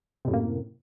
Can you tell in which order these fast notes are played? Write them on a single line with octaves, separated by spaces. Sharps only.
C3 A2 F#2 A#3